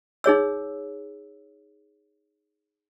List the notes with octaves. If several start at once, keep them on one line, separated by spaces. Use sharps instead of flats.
D#4 G#4 C#5 E6